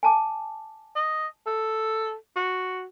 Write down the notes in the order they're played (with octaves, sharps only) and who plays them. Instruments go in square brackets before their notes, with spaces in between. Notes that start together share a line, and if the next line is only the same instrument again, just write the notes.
[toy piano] G#5 A5 D6
[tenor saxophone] D#5
A4
F#4